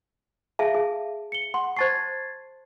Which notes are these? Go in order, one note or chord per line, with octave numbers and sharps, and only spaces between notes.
G#4 E5 F5 A5
G#4
C#7 G7
F#5 C6
C5 A5 C#6 G#6 A6 C7